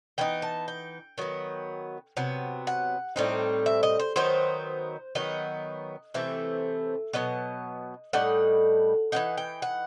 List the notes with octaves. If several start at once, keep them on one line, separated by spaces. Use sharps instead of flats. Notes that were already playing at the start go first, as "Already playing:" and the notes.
E3 B3 D#4 G5
A5
G5
D#3 F#3 B3
C3 F#3 B3
F#5
A2 G3 C4 D#4
E5
D#5
C5
D#3 F#3 B3 D#4 C5
D#3 F#3 B3 D#4 D#5
C3 E3 A3 C4 E5
B2 F#3 B3 D#5
A2 G3 D#4 F#5
E3 B3 D#4 F#5
G5
F#5